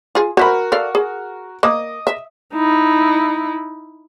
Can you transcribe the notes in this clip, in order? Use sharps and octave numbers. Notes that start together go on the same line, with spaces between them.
F4 G#4
F#4 A#4 C5 E5 B5
A4 D5 F5
G#4
A#3 D#5 D6 D#6
E5
D#4 E4